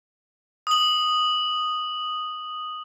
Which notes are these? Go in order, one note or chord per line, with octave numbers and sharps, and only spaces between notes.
D#6 F#7